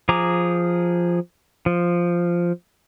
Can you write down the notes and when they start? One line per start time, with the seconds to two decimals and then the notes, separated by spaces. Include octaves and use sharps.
0.09 F3 G#4 A#5 D6
1.66 F3